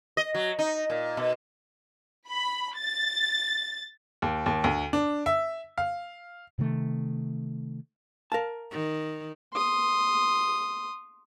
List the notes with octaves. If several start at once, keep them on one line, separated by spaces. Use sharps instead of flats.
D#5
F#3
D#4
A#2
B2
B5
A6
D#2
D#2
D2
D4
E5
F5
C3 D#3 A3
A#4 F5 A5
D#3
C6 D#6